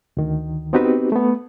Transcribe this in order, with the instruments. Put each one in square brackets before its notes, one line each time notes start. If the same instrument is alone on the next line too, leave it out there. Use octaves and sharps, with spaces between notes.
[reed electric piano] D2 D#3
B3 C4 D#4 F#4 G4 B4
A3 B3